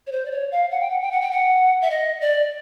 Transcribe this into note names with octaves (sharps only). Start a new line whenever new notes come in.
C#5
C5
D5
C#5
F5
F#5
G5
F#5
G5
F#5
G5
F#5
E5
D#5
D5